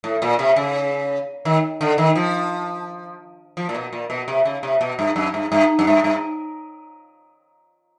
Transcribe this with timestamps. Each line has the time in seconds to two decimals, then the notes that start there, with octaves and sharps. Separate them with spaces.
0.04 A2
0.22 A#2
0.39 C3
0.56 C#3
1.45 D#3
1.81 D3
1.98 D#3
2.16 F3
3.57 F3
3.69 A#2
3.75 B2
3.93 A#2
4.10 B2
4.28 C3
4.45 C#3
4.63 C3
4.81 B2
4.99 G2
5.16 F#2
5.34 G2
5.52 G2
5.79 F#2
5.87 G2
6.04 G2